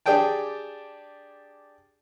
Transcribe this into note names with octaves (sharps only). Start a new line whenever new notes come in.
D4 G4 G#4 D5 G5 A5